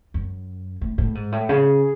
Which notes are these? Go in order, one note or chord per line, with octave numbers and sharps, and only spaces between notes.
F#2
A2
A2
G#2
A2
C#3 G#4